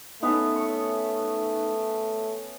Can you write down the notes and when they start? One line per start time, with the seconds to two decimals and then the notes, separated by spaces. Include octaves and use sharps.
0.23 A3 B3 C#4 D#4 E5
0.56 C#6